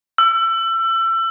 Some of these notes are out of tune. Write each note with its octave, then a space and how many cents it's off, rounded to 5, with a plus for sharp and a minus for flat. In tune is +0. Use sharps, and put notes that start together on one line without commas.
E6 +30